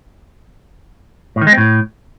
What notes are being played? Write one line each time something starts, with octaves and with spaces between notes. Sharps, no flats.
A2
D#3
G#3
C4
A2